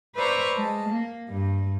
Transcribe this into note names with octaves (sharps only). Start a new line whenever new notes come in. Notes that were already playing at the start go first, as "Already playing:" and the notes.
B4 C5 D5 E5 A#5 C#6
G#3 A5
A#3
G2